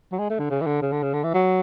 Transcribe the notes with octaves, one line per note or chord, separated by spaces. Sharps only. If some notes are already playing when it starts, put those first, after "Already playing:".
F#3
G#3
A3
D3
C#3
E3
D3
C#3
D3
C#3
D3
E3
F#3